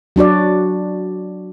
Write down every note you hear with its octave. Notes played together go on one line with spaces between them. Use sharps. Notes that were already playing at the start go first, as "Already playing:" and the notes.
F#3 D4 F#4 D5